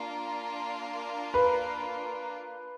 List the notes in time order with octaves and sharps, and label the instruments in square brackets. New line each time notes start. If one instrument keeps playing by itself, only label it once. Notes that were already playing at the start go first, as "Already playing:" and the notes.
Already playing: [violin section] A#3 D4 F4 A#4
[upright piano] B4